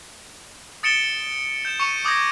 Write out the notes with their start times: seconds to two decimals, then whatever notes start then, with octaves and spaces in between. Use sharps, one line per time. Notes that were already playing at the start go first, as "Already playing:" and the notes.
0.83 D#6 A6 C#7 D7 E7 G7
1.65 G6 E7
1.80 C#6 C#7 D#7 F7
2.05 D6 D#6 G6 G#6 A#6 D7